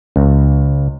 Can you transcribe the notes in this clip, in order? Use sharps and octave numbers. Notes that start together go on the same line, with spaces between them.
C#2